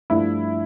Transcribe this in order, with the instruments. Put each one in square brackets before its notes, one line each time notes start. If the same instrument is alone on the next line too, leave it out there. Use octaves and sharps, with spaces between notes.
[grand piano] G2 F3 A3 D4 [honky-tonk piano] E4